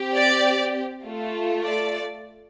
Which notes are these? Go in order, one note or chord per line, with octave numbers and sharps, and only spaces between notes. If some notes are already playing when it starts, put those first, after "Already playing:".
Already playing: C4 G4
D5
A3 F4 A4
D5